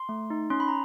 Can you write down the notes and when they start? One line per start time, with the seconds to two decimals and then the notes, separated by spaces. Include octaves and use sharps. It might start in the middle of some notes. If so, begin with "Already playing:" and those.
Already playing: C6
0.09 A3
0.30 D#4
0.50 C#4 C6
0.60 B5
0.68 A#5